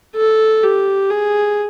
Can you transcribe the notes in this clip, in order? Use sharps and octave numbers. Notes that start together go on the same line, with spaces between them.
A4
G4
G#4